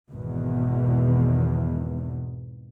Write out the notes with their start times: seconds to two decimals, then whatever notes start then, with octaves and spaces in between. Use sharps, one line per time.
0.10 G#1 E2 B2